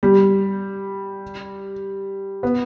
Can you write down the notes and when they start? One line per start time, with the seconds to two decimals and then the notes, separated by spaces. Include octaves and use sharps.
0.03 G3
2.43 B3